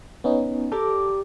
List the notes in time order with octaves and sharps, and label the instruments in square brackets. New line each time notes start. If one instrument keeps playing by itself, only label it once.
[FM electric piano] B3 C#4 D#4
[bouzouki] G4 A#4 D5 [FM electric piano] A4